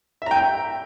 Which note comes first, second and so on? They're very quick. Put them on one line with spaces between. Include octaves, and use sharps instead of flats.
E5 A#5 G5